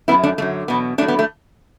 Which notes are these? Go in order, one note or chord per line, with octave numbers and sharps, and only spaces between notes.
F#2 F#3 B3 E4
A3 D4
F#2 D3 F#3 A3
E2 B2 F#3 B3
A2 F#3 A3 D4
B3
A3